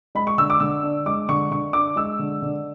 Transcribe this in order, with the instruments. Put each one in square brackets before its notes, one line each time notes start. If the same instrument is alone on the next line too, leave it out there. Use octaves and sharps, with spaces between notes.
[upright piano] G#3 B5
C#6
D3 E6
D6
D3 E6
D4
G#3 D6
D3 C#6
D3 C#6
D4 D6
G#3 E6
D3
D3